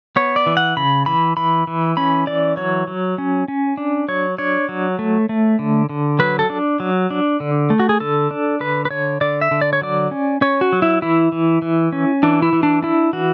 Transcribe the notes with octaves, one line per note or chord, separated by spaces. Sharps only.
B3 C#5
D5
E3
F#5
C#3 B5
E3 B5
E3 B5
E3
C#4 B5
E3 D5
F#3 C#5
F#3
C#4
C#4
D4
F#3 C#5
D4 C#5
F#3
A3
A3
D3
D3
F#3 B4
A4
D4
F#3
D4
D3
A3
F#4
G#4
D3 A4
D4
D3 B4
B4
D3 C#5
D3 D5
E5
D3
D5
C#5
F#3 D5
C#4
C#4 C#5
F#4
F#3
E4
E3 E4
E3
E3
C#4
E3 D4
E4
E3
D4
D4 E4
E3 F#4